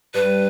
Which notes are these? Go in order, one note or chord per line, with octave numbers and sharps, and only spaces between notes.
G2 G3 B4